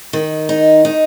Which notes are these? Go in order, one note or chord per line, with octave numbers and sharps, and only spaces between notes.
D#3
D#4
D#4